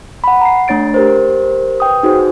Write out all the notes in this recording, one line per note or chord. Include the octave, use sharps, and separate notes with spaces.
F#5 B5
A#5 C7
A3 D4 C#5 A6 D7
G4 A#4 C5
B4 G5 D#6
D#4 F#4 G#4 C5